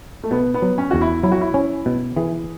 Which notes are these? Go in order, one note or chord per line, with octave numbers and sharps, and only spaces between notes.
A3
B2 B3
B3
F#3
C#4
E2 F#4
E4
F#3 E4
F#4
E4
C#4
B2
E3 G#4